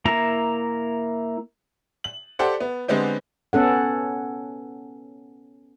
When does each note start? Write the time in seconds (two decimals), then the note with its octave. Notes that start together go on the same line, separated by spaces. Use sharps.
0.05 A#3 E4 A#5
2.04 F#7
2.39 G4 A4 C5 D5 F#5
2.60 B3
2.88 D3 G#3 B3 C4 G4
3.53 B3 C#4 A4 F#5